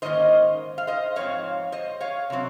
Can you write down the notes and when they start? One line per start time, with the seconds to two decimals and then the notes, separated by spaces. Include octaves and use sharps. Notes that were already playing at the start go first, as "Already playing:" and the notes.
0.02 G#2 D#3 A#3 C#4 C5 D#5
0.78 F5
0.87 C5 D#5
1.16 G#2 F3 C4 C#5 F5
1.72 C5 D#5
2.01 C#5 F5
2.30 C3 F#3 C4